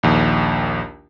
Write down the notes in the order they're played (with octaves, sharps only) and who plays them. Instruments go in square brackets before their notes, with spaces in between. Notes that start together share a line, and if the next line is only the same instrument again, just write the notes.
[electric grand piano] A#1 D#2